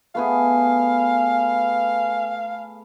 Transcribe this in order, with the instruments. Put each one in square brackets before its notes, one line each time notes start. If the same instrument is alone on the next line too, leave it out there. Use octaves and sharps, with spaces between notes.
[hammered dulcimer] A3 B3 G#4 [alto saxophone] F5